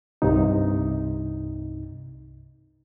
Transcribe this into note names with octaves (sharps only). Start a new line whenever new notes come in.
C2 G2 C3 D#4